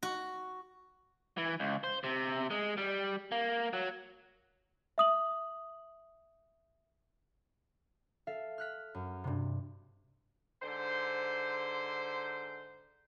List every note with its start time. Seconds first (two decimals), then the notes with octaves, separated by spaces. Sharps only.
0.03 F#4
1.38 E3
1.60 C#2
1.84 C5
2.04 C3
2.51 G#3
2.78 G3
3.32 A#3
3.73 F#3
4.98 E5 D#6 F#7
8.27 A4 E5 F5
8.58 F6 F#6 B6
8.94 F#2
9.24 G2 C3
10.62 G#2 D3 C5